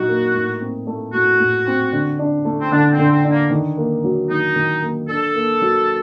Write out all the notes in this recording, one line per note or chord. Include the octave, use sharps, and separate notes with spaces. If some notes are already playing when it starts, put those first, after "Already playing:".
Already playing: A#2 F#3 D#4 F#4
A#3
A2
C4
A3
A2 F#4
A2
C4
D3
D4
A3
C4
D3 D4
C4
D3
C4
D4
A#3
D#3
A#3
F#3
D#3 D#4
D#3
A#3
D4 A4
A#3
F#3